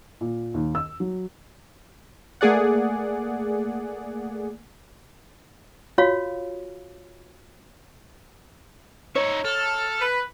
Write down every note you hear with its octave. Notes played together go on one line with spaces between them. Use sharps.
A#2
D#2
E6
F#3
A3 A#3 G#4 D5 F#5
F4 F#4 C#5 F5
D#4 C#5 E5
A4 F6
B4